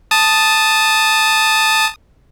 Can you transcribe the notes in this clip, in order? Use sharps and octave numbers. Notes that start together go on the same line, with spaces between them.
A5 D#6